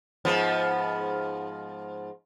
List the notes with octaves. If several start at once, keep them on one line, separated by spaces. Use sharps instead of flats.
G#2 F3 B3